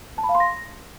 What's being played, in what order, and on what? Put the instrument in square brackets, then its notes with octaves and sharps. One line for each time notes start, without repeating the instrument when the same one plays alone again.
[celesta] A5
B5
F5
C6
A#6